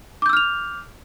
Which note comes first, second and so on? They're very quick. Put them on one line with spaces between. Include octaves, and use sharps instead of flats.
D6 G6 E6 F6 F7